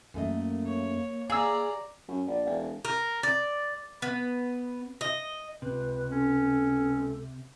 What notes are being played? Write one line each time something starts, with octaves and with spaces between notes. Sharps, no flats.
F#2 A3 A#3 D#5
C#5
G#4 D5 F5 A#5 E6
F#2
A#1 D5
E1
A#4
D5
B3
D#5
C#2 C3 B4
C#4 A4